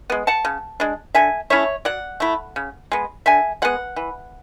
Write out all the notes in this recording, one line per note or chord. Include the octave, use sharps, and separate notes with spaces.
G#3 B3
F#5 A5
C#3
G#3 D4
D3 E5 G#5
A3 C#4 E4 C#5 E5
F#3 D5 F#5
A3 E4
C#3
G#3 B3
D3 E5 G#5
G#3 B3 F#5
E3